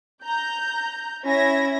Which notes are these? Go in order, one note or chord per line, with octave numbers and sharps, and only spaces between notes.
A#5 G6
C#4 E4 E5 G#6 A#6